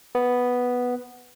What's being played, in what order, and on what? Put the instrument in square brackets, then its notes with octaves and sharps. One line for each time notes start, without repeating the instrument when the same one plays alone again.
[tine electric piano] B3